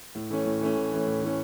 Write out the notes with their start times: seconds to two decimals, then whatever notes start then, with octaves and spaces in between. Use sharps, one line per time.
0.15 A2
0.30 E3 A3 C#4
0.46 A2
0.61 E3 A3 C#4
0.76 A2
0.92 E3 A3 C#4
1.07 A2
1.22 E3 A3 C#4